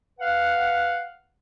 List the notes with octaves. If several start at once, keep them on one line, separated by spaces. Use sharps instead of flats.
B4 F5 F#5